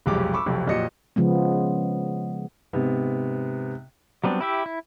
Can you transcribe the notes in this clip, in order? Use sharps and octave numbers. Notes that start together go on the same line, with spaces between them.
F1 B1 F2 G#3 G4 D6
B5 C#6 D6 E6
F1 B1 F2
F2 A#2 F#3 G4 D#5 C#7
C#3 F3 G#3 B3
G#2 C3 B3
F#3 G3 B3 C4 D4
E4 G4 E5
E4